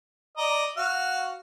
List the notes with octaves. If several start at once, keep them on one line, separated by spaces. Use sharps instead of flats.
D5 D#5 A#5
F#4 F5